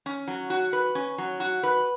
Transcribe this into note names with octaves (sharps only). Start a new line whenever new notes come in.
C#4
F#3
F#4
B4
C#4
F#3
F#4
B4